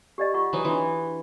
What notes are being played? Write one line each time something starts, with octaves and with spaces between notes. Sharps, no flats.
G4 D5 D#5
F4 F#5 C#6
E3 F#3 D#4
E3 D4 C6